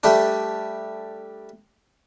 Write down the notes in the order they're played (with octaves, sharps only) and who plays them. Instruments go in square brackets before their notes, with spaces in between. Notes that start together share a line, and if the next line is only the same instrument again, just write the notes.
[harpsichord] G3 A3 D4